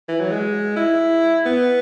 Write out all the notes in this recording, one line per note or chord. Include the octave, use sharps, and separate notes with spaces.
E3
F#3
G#3
E4
B3